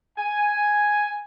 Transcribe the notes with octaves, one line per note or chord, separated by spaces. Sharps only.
G#5